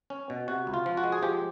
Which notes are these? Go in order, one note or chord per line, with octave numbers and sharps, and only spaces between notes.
C#4
B2
C3 F#4
C#2
F4
F3
F#4
G#3
G#4
F3 G4